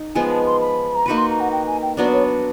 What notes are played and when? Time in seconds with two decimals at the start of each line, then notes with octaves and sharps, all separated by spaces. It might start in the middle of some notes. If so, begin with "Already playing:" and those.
Already playing: D#4
0.15 F3 G#3 B3 G#5
0.30 A5
0.46 C6
0.61 B5
0.95 A#5
1.06 A#3 D#4 F#4 B4 B5
1.17 C6
1.29 A#5
1.40 F#5
1.52 G5
1.67 G#5
1.82 G5
1.97 F#3 B3 D4 D5
2.12 C#5